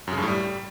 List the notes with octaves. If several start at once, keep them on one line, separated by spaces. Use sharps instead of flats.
F#2
C#3
G2
A2
G3